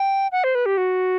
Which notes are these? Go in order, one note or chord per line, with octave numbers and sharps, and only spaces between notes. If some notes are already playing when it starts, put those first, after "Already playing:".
Already playing: G5
F#5
C5
B4
G4
F#4